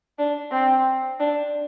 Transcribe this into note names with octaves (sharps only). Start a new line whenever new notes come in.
D4
C4
D4